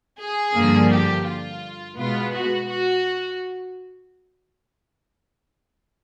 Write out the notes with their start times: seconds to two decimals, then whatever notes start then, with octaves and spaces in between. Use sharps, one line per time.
0.19 G#4
0.54 G2 D3 F3 A#3
0.90 G4
1.26 F4
1.96 B2 G#3 B3 F4
2.32 F#4
2.68 F#4